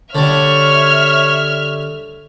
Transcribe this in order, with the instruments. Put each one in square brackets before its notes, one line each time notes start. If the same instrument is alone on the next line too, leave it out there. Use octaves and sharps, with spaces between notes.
[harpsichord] D3 G3 [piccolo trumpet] C#5 [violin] E5 F6